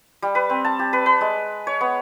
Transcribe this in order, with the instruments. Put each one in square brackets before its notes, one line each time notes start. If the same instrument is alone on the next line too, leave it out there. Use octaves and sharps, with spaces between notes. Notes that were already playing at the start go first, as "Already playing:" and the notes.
[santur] G3
B4
C4
A5
G4
B4
B4
G#3
C#5
B3